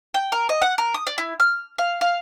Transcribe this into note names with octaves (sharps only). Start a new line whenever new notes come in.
G5
A#4
D#5
F#5
A#4
D#6
D5
E4
F6
F5
F5